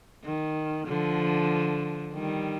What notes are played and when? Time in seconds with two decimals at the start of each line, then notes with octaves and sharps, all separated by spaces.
0.24 D#3
0.88 D3 F3
2.14 D#3 G3